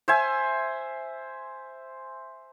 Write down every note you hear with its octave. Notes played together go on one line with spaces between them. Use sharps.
C5 E5 G#5